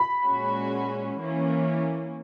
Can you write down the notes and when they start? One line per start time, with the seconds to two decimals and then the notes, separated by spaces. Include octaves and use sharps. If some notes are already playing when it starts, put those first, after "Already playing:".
Already playing: B5
0.24 A#2 G#3 C#4 F#4
1.18 E3 A#3 C#4